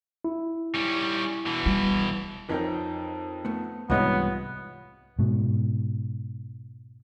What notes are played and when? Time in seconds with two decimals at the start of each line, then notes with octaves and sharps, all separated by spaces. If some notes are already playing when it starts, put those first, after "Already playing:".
0.25 E4
0.74 G3 C#4
1.46 B2 E3
1.66 G3
2.49 F2 D#4 A#4 B4 C#5 G5
3.45 A3 B3
3.90 C2 G#2 E3 G3 B3 F4 C#5 D#5
5.19 G#2 B2